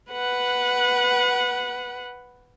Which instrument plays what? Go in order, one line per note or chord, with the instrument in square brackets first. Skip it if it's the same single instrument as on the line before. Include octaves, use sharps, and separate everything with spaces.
[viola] B4 F#5